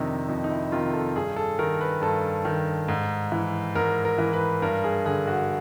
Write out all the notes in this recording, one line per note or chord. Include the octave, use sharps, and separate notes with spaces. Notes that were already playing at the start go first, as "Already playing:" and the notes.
Already playing: F2 C3 D#3 D4 D#4
F2 D#4
D#4
E4
C3 D#3 F4
A4
G2 G#4
A4
D#3 A#4
B4
G2 A4
D#3
G#2
E3
G#2 A#4
A#4
E3
B4
G2 A#4
G#4
D3 G#4
F#4